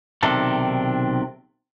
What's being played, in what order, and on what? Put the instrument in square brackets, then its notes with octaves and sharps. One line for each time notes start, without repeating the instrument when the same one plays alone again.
[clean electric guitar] B1 C3 D#3 D4 A4